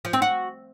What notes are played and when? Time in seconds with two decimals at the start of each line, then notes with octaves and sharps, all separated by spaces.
0.05 F3
0.13 C4
0.22 F#4